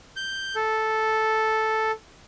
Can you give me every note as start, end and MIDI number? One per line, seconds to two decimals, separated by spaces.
0.16 0.55 91
0.55 1.91 69